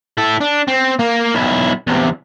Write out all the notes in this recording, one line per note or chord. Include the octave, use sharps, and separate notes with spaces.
E4 A4
D4
C4
A#3
B1 E4
E2 C3